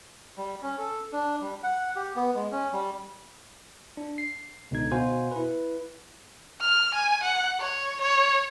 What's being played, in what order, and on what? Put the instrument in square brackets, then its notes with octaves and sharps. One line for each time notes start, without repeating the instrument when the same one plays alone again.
[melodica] G3
C#4
A4
D4
G3
F#5
G4
B3
G#3
C#4
G3
[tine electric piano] D4
C7
C#2 B2 D3 D#4 G#6
B2 F#4 C5 F5 G#5
E4 B4
[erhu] F6
G#5
F#5
C#5
C#5